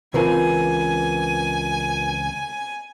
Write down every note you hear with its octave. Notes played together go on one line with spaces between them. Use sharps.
C#2 E3 C4 F4 A#4 B4 G#5